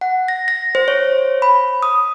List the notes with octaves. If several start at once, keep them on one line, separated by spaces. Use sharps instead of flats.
F#5
A#6
A#6
C5
C#5
B5
D#6